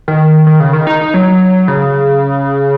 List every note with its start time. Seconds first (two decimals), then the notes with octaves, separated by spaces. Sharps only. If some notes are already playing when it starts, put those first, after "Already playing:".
0.08 D#3
0.47 D#3
0.60 C#3
0.73 D#3
0.87 D#4
1.01 D#4
1.14 F#3
1.68 C#3